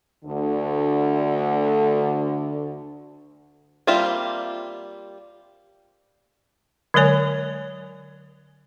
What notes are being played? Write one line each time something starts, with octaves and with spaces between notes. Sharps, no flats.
D2 D3
G3 A#3 C4 F4 E5
D3 F#3 G#3 A#4 C#5 G#5